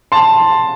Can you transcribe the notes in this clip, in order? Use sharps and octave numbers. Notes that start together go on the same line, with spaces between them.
A5 C6